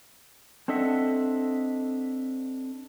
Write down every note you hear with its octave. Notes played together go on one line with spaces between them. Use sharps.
C4 D4 A4 D#5 E5 F#5